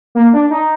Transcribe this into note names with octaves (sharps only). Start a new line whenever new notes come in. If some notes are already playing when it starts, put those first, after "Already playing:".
A#3
D4
D#4